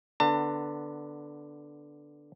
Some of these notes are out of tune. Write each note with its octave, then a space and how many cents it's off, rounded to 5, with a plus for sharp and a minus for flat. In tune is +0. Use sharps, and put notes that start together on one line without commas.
D3 +0 B3 +0 A5 +35